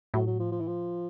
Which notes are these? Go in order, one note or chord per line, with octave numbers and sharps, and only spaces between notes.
A2 F#3
F#3
F3
F3
E3
F3